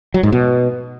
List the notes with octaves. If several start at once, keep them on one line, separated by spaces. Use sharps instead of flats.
F#3
G#2
B2